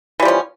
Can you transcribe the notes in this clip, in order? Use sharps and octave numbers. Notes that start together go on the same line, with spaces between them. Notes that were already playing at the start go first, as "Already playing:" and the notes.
E3 F3 G3 C#4